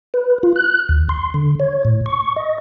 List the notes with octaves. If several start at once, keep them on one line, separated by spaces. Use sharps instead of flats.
B4
F4
F#6
D#2
C6
D3
C#5
A2
C#6
D#5